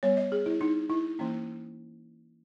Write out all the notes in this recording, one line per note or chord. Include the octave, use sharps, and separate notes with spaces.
G3 B3 C#5
D#5
G#4
E4
D#4
E4
E3 A#3 C#4